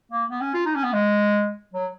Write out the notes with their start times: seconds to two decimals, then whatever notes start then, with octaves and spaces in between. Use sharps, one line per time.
0.12 A#3
0.30 B3
0.42 C#4
0.54 F4
0.66 D#4
0.75 C#4
0.84 B3
0.93 G#3
1.74 F#3